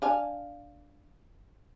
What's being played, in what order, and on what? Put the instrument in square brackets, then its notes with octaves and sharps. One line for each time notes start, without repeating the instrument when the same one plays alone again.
[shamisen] D4 F5 G#5